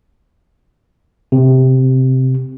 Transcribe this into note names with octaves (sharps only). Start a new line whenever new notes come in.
C3